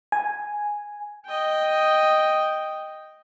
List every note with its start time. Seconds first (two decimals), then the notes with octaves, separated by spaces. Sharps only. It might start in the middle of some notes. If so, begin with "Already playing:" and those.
0.12 G#5
1.26 D#5 G5